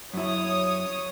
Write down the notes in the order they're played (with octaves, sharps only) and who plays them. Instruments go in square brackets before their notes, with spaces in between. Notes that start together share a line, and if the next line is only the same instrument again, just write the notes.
[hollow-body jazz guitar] F#2 E4 [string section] C#5 D#6